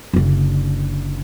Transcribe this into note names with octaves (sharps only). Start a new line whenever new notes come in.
F#1 D3